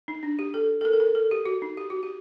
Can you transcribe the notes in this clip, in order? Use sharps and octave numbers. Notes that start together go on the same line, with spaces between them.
D#4
D4
G4
A4
A4
A#4
A4
A#4
A4
G4
F#4
D#4
G4
F#4
G4